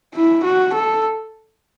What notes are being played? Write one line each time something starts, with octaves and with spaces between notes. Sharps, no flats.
E4
F#4
A4